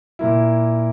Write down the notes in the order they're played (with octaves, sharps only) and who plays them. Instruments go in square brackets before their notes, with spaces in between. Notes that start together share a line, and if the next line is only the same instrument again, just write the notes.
[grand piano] A#2 A#3 E4